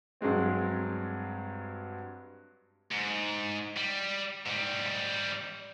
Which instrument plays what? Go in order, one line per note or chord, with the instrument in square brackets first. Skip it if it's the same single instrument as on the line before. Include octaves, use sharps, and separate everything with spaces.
[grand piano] G2 F#3 G#3 C4
[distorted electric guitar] G#2
G3
G#2 G3